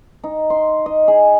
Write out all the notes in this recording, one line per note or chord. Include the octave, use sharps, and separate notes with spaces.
D#4
C6
D#5
G#4